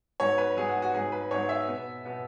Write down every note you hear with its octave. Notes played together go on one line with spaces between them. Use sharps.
G#2 F#3 B3 C#5
B4
G#2 F#3 B3 G#4
F#4
F#4
G#2 F#3 B3 G#4
B4
G#2 F#3 B3 C#5
E5
B2 B3
B2 B3